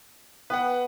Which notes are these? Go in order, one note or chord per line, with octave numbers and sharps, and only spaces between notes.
B3 B4 F#5 G5